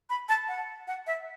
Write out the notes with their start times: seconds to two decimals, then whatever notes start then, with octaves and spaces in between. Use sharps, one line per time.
0.10 B5
0.29 A5
0.48 F#5
0.88 F#5
1.07 E5